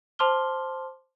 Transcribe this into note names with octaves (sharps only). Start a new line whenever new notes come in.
C5 A5 C6 D6 F6 G7